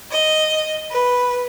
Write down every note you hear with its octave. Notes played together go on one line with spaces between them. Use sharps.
D#5
B4